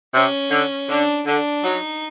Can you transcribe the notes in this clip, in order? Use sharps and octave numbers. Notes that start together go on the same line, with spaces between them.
C3 C#4
D3
D3 D4
D3 D4
F#3 D#4